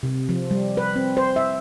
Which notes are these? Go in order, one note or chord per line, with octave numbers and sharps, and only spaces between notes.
C3
F3
G3
B4
C4
C5
E5